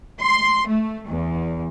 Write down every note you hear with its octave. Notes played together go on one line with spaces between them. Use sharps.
C6
A3
E2